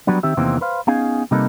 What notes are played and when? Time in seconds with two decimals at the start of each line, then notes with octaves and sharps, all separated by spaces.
0.07 F#3 G3 B3 D4
0.23 D#3 C4 G4 E5
0.37 E2 C3 D#3 E3 A#3 C4
0.61 B4 C5 F5
0.87 B3 C#4 D#4 G#4 F5 G#5
1.31 C3 G3 A#3 D#4 A4 B4